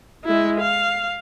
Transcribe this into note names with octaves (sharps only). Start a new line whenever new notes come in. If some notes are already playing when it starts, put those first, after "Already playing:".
G#3 E4
F5